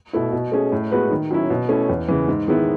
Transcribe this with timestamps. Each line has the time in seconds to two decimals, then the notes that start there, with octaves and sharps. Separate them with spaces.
0.13 B2 A3 E4
0.32 B2
0.52 A3 C#4 G#4
0.72 A2
0.91 G#3 B3 F#4 B4
1.11 D#3
1.31 F#3 C#4 E4
1.50 B2
1.69 A3 C#4 E4
1.89 E2
2.08 C#3 E3
2.28 G#2
2.48 D#3 G#3 B3 E4